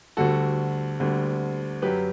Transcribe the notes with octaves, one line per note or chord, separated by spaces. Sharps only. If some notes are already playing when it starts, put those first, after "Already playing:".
D2 D3 G3 F#4 A4
D2 D3 G3
F#2 F#3 G4 B4